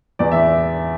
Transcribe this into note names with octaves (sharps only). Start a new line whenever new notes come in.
E2 D5
E5